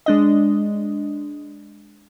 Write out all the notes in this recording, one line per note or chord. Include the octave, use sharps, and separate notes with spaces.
G#3 D4 D#5